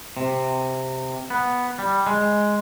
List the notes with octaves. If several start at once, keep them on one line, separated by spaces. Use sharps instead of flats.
C3
B3
G3
G#3